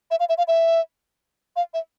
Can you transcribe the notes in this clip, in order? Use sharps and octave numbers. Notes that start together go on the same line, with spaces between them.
E5
F5
E5
F5
E5
F5
E5